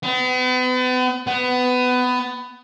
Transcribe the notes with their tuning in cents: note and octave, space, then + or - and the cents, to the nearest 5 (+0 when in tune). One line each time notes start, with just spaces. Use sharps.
B3 +40
B3 +20